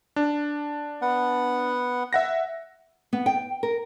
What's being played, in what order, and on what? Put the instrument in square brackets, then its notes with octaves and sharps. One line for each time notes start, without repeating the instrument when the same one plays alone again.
[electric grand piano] D4
[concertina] B3 F#5
[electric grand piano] E5 F#5 A#6
[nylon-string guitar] B3
G5
A#4